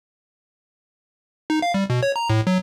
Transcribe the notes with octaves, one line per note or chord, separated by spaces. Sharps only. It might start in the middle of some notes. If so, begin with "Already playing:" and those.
D#4
F5
G3
B2
C#5
A#5
A2
F#3